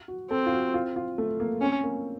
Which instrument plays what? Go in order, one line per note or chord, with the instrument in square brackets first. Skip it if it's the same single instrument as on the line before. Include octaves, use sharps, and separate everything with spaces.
[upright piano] F#4
[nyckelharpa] C4 [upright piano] A4
[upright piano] F4
F#4
F4
F4
A3
A#3
[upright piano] C4 [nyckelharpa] C#4
[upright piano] A#3